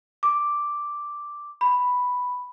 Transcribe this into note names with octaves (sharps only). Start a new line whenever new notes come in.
D6
B5